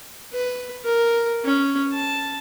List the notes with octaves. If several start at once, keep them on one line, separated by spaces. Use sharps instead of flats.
B4
A#4
C#4
A5